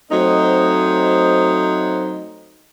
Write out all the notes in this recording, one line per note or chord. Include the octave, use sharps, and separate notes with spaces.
F#3 A3 C4 D#4 C5 D#5